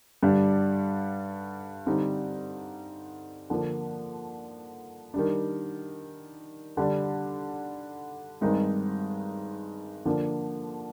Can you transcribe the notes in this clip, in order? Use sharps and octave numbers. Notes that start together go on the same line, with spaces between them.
G2 D3 G3 D4
D3 G3 C4 D#4
D3 F3 A#3
D#3 G3 D4
D3 G3 D4
G2 D#3 G#3 C4 D#4
D3 F3 A#3 D4